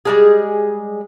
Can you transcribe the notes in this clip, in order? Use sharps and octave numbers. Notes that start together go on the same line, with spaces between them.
G3 G#3 G#4